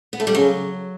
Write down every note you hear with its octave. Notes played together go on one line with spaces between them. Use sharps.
B3
A3
G3
C#3 F#3